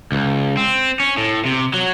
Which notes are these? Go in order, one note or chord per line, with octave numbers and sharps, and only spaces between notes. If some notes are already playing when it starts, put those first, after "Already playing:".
C#2
C4
C#4
A2
C3
F#3